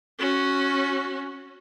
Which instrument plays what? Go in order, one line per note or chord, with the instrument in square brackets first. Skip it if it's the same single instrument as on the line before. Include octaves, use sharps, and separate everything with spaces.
[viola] C#4 F#4